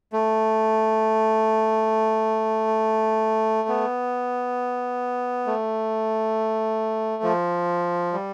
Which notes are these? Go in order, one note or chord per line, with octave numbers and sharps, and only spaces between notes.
A3
B3
A3
F3
G3